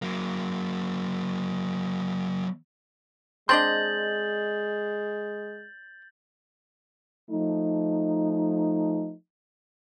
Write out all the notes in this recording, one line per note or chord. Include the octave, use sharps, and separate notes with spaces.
F#3 A#3
G#3 C4 D4 D#5 C6 G6 A6 F#7
F3 A3 D#4